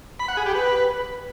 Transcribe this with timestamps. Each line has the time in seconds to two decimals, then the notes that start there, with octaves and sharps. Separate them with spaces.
0.20 B5
0.28 F#5
0.37 G#4
0.46 G4
0.55 B4